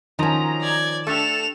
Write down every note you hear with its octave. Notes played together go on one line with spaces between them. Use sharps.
D#3 F3 F#3 C#4 D#5 G#5 A#5
D5 G#6
A3 D4 G4 A4 E7 F7